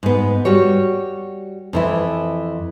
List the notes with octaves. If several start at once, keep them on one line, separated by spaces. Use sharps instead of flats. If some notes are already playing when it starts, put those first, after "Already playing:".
G#2 B3
G3 F#4 C#5
F2 E3 E4